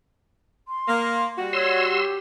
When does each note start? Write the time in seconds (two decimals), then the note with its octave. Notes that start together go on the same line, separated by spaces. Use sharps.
0.68 C6
0.88 A#3
1.38 G3 F#4
1.53 C#5 C6 E6
1.90 G4